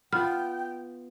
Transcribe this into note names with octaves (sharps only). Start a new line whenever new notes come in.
B3 F4 G5 F6